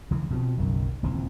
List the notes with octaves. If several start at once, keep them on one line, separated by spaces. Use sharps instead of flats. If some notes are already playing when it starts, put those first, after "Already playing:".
C#2 E3
B2 F3 C4
F#1 B1 F#2 D#3
D#1 C#2 E3 C4